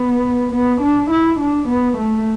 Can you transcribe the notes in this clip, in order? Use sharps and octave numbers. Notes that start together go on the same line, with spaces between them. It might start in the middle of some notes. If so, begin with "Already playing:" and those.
Already playing: B3
B3
D4
E4
D4
B3
A3